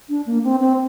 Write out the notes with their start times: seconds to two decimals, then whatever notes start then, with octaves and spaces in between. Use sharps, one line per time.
0.09 D4
0.26 A#3
0.44 C4
0.60 C4